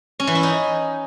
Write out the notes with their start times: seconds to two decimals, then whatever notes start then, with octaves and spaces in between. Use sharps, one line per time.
0.20 C#4
0.27 E3
0.35 E4
0.43 D#4